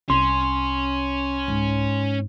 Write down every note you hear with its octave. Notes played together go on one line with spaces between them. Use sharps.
C2 C#4 C6
G#2